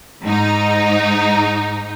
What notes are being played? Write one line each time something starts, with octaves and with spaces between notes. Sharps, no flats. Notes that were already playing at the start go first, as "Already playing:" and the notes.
G#2 D#4